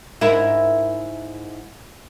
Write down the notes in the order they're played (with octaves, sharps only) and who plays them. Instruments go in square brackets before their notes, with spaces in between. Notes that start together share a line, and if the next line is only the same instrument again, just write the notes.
[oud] G#2 E4 A#4